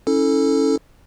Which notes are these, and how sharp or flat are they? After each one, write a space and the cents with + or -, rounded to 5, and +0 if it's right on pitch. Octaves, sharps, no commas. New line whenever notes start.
C#4 +0 E4 -30 A4 +0